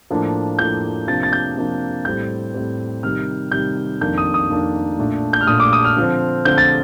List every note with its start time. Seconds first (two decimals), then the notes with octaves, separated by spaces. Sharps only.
0.10 A2 F3 A#3 D4
0.59 A2 F3 A#3 D4 G6
1.07 C3 F3 A#3 D4 A6
1.23 A6
1.33 G6
1.57 C3 F3 A#3 D4
2.05 A2 G3 C4 G6
2.54 A2 G3 C4
3.03 C3 D#3 G3 F6
3.52 C3 D#3 G3 G6
4.01 F2 D#3 A#3 D4 G6
4.18 D#6
4.34 D#6
4.50 F2 D#3 A#3 D4
4.99 A#2 A3 D4
5.33 G6
5.41 F6
5.47 A#2 A3 D4 D#6
5.60 D6
5.73 D#6
5.84 F6
5.97 D3 F3 C4
6.45 D3 F3 C4 G6
6.58 A6